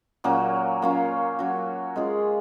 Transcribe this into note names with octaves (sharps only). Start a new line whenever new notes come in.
A#2 F#3 A#3 C#4
F#3 A#3 C#4 F4
F#3 C#4 F#4
G#3 C#4 F4 G#4